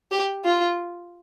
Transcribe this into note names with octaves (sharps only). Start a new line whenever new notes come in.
G4
F4